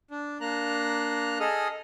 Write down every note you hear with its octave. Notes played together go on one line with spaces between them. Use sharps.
D4
A#3 D4 A#5 F#6
G#4 A4 D#5 D#6 F6